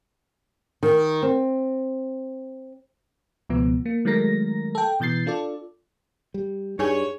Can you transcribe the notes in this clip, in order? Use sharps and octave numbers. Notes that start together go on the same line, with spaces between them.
D#3
C4
C#2 B2 F3 B3
A#3
D#3 F#3 G#3 A3 A#4 A#6
A4 G5
B2 E3 G6 A6 C7
D4 F4 A4 D5
G3
G2 D#4 G#4 C#5 G#5